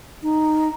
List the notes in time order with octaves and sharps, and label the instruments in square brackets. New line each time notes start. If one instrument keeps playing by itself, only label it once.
[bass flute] D#4